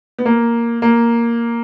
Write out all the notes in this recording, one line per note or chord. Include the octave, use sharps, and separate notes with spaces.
B3
A#3
A#3